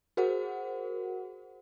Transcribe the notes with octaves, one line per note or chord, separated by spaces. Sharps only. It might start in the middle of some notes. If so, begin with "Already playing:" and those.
F#4 G#4 A#4 C5 F#5